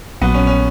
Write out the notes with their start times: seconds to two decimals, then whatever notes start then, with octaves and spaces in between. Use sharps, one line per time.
0.21 A#1 A#2 F#3 B3
0.34 C#4
0.47 C#4